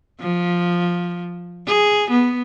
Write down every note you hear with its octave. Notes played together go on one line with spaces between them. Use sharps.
F3
G#4
B3